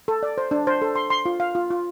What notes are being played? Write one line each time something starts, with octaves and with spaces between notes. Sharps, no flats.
A4
D5
C5
D4
C5
A4
C6
C6
F4
F5
F4
F4